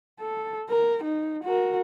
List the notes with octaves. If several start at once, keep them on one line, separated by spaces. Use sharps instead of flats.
A4
A#4
D#4
F#4 A#4